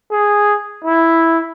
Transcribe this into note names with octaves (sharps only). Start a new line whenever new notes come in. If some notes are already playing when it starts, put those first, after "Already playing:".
G#4
E4